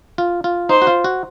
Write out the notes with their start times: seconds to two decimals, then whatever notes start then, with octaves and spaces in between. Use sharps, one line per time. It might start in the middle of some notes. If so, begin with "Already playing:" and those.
0.18 F4
0.44 F4
0.69 D#4 C5
0.82 F#4
0.87 F4
1.04 F#4